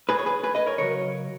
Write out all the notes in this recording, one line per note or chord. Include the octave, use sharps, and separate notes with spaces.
G#4 B4
C#5
G#4 B4
G#4 B4
B4 D#5
A#4 C#5
C#3 F#3 A#4 C#5